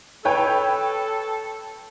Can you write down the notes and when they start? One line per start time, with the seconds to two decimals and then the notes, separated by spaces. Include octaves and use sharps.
0.25 A4 B4 C#5 G5